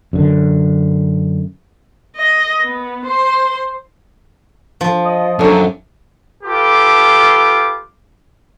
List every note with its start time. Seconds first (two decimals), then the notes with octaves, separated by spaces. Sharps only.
0.13 F#2 D3
2.16 D#5
2.62 B3
3.06 C5 C6
4.81 F3
5.05 D#5
5.39 F#2 F#3 A3 D4
6.44 F4 G4 A4 B4 D6